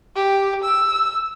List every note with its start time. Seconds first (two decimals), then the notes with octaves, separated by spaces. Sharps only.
0.16 G4
0.64 E6